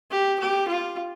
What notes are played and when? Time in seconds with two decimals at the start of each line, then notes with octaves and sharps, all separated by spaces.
0.11 G4
0.39 G4
0.68 F4